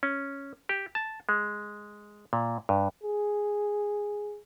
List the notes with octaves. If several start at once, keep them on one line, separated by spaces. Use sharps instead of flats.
C#4
G4
A5
G#3
A#2
G2
G#4